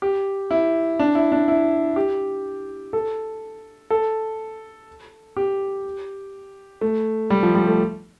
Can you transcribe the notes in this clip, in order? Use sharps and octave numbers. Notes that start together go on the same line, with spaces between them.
G4
E4
D4
E4
D4
E4
G4
A4
A4
G4
A3
G3
F3
G3
A3